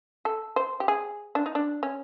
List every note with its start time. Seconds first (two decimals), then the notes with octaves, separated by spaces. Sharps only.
0.25 A4
0.56 C5
0.80 G4
0.88 G#4
1.35 D4
1.46 D#4
1.55 D4
1.83 C#4